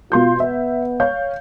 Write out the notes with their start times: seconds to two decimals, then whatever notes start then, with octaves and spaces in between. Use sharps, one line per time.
0.12 B2 F4 C6 G6
0.40 B3 E5
1.00 C#5 F5 G6